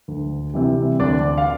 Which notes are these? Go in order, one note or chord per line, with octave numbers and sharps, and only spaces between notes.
D2
C3 E3 G3
D2 D4 D5
F5